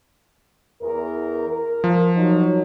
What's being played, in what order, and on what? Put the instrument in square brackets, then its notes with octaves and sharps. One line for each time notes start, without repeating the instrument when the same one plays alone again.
[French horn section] E2 A#4
A#4
[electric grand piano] F3
[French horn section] F#3 D#4